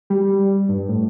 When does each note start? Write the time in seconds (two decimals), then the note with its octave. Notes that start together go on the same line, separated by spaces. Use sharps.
0.10 G3
0.69 G2
0.89 A2